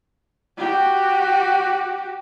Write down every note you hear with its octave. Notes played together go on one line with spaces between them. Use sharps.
F#4 G4